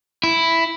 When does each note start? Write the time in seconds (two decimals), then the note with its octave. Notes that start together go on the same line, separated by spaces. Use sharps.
0.24 E4